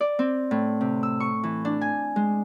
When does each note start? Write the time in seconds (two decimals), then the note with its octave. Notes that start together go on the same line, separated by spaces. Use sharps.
0.01 D5
0.19 C4
0.51 A2
0.81 C3
1.03 E6
1.20 C#6
1.43 E3
1.65 D4
1.81 G#5
2.16 G#3